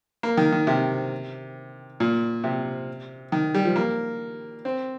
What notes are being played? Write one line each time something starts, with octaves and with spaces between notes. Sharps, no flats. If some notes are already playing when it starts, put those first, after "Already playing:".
A#3
D#3
D#3
C3
A#2
C3
D#3
G3
F3
A#3
C4